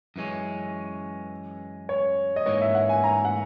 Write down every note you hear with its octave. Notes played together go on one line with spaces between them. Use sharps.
F#2 E3 G#3 C#4
C#5
D#5
G#2 E3 A#3 C#5
E5
F#5
G#5
A#5
F#5